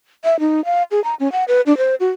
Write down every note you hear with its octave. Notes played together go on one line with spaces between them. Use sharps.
E5
D#4
F5
G#4
A#5
C#4
F#5
B4
D4
C5
F#4